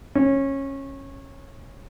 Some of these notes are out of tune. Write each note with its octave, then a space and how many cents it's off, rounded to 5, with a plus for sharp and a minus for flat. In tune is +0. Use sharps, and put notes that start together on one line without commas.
C#4 -20